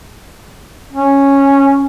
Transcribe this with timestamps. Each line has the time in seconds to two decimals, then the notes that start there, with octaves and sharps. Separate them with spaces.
0.93 C#4